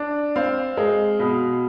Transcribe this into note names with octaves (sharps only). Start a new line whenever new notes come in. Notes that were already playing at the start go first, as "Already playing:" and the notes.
Already playing: D4
C4 F5
G#3
B2